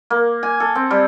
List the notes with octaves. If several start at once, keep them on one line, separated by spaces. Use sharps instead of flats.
A#3
G#5
A4
C4
G3